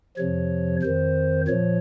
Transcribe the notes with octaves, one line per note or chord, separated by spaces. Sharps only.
F2 C3 F3 C#5
F2 D#3 C5
A#2 F3 C#5